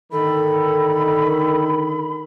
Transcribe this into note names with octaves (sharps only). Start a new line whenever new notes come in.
D3 D#3 A4 B5